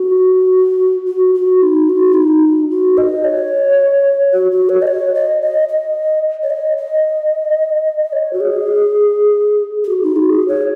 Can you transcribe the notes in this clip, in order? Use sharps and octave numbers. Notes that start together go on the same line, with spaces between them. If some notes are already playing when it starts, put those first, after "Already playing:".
Already playing: F#4
F#4
F#4
D#4
F#4
D#4
F#4
D#5
C#5
F#4
F#4
C#5
D#5
C#5
D#5
D#5
D#5
C#5
D#5
D#5
D#5
C#5
F#4
G#4
G#4
F#4
D#4
F#4
G#4
C#5